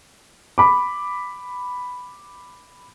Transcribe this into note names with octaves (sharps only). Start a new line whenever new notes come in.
B5 D6